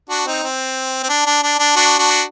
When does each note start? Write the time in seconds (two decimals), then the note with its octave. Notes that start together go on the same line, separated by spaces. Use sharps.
0.10 D4 F#4
0.26 C4 D#4
0.43 C4
1.03 C4
1.09 D4
1.26 D4
1.43 D4
1.59 D4
1.76 D4 F#4
1.98 D4 F#4